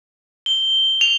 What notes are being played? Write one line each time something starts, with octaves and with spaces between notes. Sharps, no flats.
G7
F7